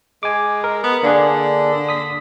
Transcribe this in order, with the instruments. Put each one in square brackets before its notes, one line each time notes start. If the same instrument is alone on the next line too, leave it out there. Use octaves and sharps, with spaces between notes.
[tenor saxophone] G#3 [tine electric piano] G#5 D6
[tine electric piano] A#4
[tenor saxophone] B3
[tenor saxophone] D3 [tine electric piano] A#3 D4 G#4
[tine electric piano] D#6 B6